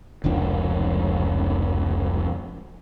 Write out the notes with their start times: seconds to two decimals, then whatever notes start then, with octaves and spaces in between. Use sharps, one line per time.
0.24 F1 C#2 F3 D4